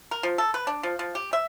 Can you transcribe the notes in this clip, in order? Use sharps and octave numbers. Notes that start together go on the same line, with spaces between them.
A#4
F3
A4
B4
D4
F3
F3
G4
E5